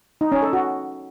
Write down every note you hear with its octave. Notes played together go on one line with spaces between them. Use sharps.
D#4
C#4
A4
F#4